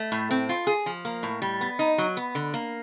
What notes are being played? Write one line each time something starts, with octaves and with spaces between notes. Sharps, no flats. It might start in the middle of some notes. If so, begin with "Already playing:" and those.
Already playing: A3
A2
C4
F4
G#4
F3
A#3
A2
G3
B3
D#4
F#3
B3
D3
A#3